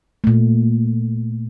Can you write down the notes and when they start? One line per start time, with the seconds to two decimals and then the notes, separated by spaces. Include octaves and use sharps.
0.24 A#2 A3